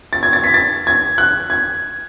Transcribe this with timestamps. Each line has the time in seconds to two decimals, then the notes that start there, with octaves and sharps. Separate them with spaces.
0.13 A6
0.23 G#6
0.33 A6
0.44 B6
0.54 A6
0.87 G#6
1.18 F#6
1.50 G#6